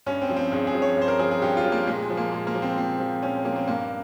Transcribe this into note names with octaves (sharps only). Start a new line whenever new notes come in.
G2 C#4
C4
F3
C4
G2 G#4
G#4
F3
C#5
G2 C5
A#4
F3 G#4
G#4
G2 G4
F4
F3
A#3
A#2 G#3
G#3
F3
A#3
A#2 G#3
A#3
F3
C4
A#2 C4
F3
A#2 C#4
F3 A#3
C4
G2 A#3